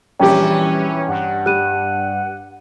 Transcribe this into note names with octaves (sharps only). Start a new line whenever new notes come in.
A#1 E3 G3 C#4 G4 G5
G2 F#5
G3 F#6 D#7